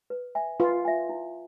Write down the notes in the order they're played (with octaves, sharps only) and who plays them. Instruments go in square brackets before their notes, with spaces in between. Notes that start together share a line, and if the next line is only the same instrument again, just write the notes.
[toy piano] B4
E5 G#5
[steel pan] F4 [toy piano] B4
[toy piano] E5 G#5
E4